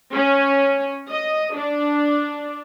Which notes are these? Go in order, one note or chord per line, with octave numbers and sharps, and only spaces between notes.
C#4
D#5
D4